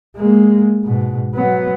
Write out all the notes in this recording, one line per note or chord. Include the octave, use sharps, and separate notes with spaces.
G#3 A#3
G#2 B2
F#3 B3